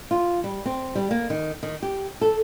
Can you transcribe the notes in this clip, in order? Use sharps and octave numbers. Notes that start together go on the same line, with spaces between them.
F4
G3
C4
G3
A#3
D#3
D#3
G4
A4